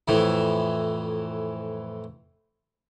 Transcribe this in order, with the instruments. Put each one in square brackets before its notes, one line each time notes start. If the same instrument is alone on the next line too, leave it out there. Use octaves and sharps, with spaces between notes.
[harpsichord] F2 A2 E3